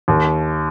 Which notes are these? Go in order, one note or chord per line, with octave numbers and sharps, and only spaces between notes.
D#2